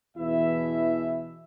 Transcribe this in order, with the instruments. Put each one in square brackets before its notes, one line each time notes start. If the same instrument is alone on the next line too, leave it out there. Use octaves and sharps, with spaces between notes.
[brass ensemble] E2 B2 E3 E4 E5